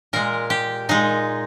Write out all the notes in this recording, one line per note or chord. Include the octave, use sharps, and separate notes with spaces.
A#2 G#3 A#4
G4
A#2 G#3 D#4